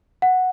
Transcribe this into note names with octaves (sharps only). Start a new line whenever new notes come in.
F#5